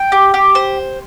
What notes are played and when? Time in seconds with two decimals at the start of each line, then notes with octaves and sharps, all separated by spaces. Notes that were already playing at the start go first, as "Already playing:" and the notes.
Already playing: G5
0.12 G4
0.34 G4
0.55 C5